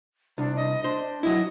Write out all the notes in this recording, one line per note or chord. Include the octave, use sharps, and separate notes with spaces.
C2 D4
D#5
D4 C5
F#3 E4 D#5